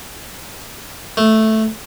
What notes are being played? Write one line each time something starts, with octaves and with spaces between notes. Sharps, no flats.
A3